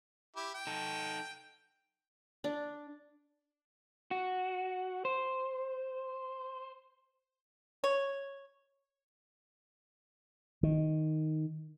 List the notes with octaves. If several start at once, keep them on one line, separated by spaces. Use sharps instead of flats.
E4 G4
G5
D#4 A4
D4
F#4
C5
C#5
D#3